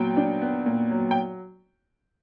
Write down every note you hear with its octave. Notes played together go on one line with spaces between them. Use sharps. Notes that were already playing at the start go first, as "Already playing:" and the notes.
Already playing: A#2 F#3 B3 G5
D4
B3
A#2
F#3
G5